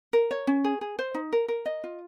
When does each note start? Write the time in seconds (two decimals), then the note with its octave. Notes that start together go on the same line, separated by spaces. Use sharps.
0.13 A#4
0.31 C#5
0.47 C#4
0.64 G#4
0.81 G#4
0.99 C5
1.14 D#4
1.33 A#4
1.48 A#4
1.66 D#5
1.84 F4